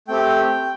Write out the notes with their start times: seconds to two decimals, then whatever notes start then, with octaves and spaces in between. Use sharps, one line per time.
0.08 A3 C4 G4 G5